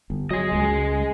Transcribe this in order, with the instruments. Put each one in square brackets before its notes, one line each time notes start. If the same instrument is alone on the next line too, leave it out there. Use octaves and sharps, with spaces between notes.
[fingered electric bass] G1
[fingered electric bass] F#3 [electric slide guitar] G#4 D#5
[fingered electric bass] C#2 G#3